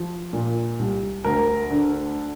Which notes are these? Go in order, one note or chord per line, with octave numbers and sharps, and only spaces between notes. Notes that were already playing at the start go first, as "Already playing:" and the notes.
Already playing: F3
A#2
C2
D2 A#4
D3